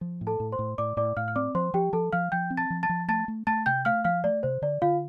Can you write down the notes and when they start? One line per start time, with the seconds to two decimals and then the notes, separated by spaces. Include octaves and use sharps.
0.01 F3
0.21 A2
0.27 A4 A5
0.40 A2
0.52 C5 C6
0.59 A2
0.78 A2 D5 D6
0.97 A2 D5 D6
1.17 A2 F5 F6
1.28 F6
1.36 C4 D5 D6
1.55 F3 C5 C6
1.74 F3 G4 G5
1.93 F3 A4 A5
2.13 F3 F5 F6
2.32 F3 G5 G6
2.50 C4
2.57 A5 A6
2.70 F3
2.83 A5 A6
2.89 F3
3.08 A3 A5 A6
3.28 A3
3.47 A3 A5 A6
3.66 C3 G5 G6
3.85 A3 F5 F6
4.04 F3 F5 F6
4.24 A3 D5
4.43 C3 C5
4.62 D3 D5
4.82 D3 F4 F5